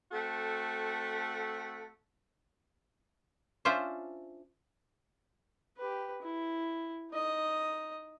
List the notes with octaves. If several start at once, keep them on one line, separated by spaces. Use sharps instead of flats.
A3 C4 F#4 A4
C#4 D4 F4 C5 E5
G4 B4
E4
D#4 D#5